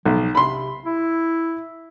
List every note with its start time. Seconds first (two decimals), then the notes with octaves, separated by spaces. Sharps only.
0.06 B1 F3
0.35 C3 B5 C6
0.85 E4